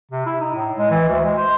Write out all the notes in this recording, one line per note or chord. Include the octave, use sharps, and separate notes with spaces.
C3
E4
D#4
A2
G#3
E3
D2
G#3
C5